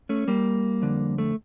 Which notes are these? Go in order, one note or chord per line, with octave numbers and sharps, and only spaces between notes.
A3 C#4
G3 A#3
F2 D3
A3